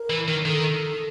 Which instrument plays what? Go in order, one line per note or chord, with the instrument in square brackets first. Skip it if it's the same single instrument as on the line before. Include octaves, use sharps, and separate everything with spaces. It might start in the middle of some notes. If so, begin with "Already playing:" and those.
Already playing: [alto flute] A#4
[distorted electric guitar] E3
D#3
[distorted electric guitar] D#3 [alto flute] A4